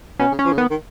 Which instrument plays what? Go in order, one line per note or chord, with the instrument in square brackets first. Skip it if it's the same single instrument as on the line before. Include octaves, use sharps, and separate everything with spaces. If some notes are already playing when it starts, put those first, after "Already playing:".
[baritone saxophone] B2 [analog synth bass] C#4
[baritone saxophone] C#3
[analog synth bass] C#4
[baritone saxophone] F3
C#3
[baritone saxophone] D#3 [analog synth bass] B3
[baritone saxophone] D#3